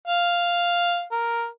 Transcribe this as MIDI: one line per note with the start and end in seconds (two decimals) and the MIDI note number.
0.08 1.04 77
1.12 1.47 70